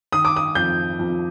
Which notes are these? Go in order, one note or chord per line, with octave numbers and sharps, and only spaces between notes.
D#3 D#6
D6
D#6
F2 G6
F2